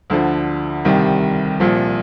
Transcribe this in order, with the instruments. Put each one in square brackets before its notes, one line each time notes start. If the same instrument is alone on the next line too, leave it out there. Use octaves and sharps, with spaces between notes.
[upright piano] D2 D3 F3
C2 C3 D#3 G3
C2 A#2 F3